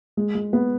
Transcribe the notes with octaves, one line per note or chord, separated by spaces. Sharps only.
G#3
G#3
B3